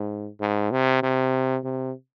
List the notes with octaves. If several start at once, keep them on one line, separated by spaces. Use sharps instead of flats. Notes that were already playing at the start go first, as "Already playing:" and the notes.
Already playing: G#2
G#2
C3
C3
C3